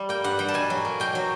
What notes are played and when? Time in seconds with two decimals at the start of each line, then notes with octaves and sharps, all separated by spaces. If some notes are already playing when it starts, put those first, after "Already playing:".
Already playing: G3
0.09 A#3 G5
0.24 G2 F#5
0.39 G3 G5
0.48 A5
0.54 B2 G#5
0.70 F#3
0.85 A#3
1.00 B2 G5
1.15 F#3